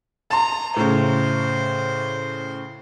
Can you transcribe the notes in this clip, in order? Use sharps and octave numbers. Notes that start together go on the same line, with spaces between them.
A5 A#5 C6
A2 C#3 C5